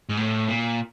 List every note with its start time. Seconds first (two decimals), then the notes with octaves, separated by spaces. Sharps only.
0.09 G#2
0.17 A2
0.48 A#2